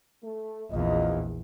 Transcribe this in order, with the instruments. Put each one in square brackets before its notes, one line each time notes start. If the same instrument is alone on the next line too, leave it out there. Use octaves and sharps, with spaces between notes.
[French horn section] A3
[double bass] A#1 E2 [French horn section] C4 F4 D#5